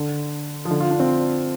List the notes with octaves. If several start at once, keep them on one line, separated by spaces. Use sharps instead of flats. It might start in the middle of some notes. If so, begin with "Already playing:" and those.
Already playing: D3
F3
D3
F4
D4
C4